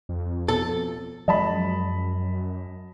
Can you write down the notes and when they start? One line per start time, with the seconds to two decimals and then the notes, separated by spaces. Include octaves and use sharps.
0.09 F2
0.48 B2 A4
1.28 F#2 F3 F#3 G#3 D#5 A5 B5